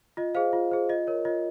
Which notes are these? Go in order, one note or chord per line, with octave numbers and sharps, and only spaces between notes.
F4 D#5
G#4 C5 F5
F4
G#4 C5
F4 D#5
A#4 C#5
F4 D#5